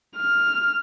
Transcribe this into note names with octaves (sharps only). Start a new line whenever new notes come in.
F6